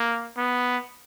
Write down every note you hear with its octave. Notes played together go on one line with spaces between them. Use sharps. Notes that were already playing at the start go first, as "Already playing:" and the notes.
Already playing: A#3
B3